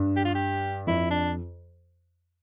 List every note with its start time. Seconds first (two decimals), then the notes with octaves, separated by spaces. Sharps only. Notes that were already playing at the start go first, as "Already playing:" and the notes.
Already playing: G2
0.16 G4
0.25 F4
0.35 G4
0.87 F2 E4
1.11 D4